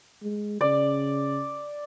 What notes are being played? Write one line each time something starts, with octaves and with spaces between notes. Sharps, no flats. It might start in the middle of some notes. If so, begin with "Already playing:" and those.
G#3
C#3 D5